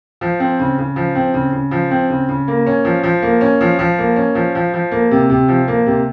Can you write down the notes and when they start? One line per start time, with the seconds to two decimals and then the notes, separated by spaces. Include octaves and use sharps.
0.21 F3
0.40 C4
0.59 C#3
0.78 C#3
0.96 F3
1.15 C4
1.34 C#3
1.53 C#3
1.71 F3
1.91 C4
2.10 C#3
2.29 C#3
2.48 A#3
2.66 C#4
2.85 F3
3.03 F3
3.22 A#3
3.41 C#4
3.61 F3
3.79 F3
3.99 A#3
4.16 C#4
4.35 F3
4.55 F3
4.74 F3
4.92 A#3
5.11 C3
5.30 C3
5.48 F3
5.68 A#3
5.86 C3